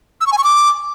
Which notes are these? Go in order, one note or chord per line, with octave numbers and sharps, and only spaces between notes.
E6
C#6
G#5
C#6
D6